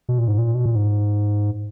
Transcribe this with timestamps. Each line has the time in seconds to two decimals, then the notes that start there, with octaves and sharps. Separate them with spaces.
0.09 B2
0.18 A#2
0.28 G#2
0.38 A#2
0.55 B2
0.66 A#2
0.75 G#2